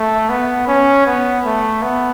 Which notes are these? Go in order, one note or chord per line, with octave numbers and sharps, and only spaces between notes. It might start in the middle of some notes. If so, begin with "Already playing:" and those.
Already playing: A3
B3
C#4
B3
A3
B3